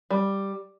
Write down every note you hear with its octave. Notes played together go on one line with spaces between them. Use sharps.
G3